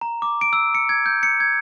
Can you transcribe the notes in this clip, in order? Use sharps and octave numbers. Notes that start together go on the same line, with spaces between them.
A#5
D6
D7
E6
C#7
G#6
G6
C#7
G#6